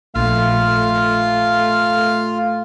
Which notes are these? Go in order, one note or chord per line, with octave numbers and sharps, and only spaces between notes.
A#1 A3 F4 F5